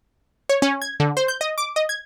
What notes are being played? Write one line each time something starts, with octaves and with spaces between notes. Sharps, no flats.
C#5
C#4
G#6
D3
C5
G6
D#5
D6
D#5
G#6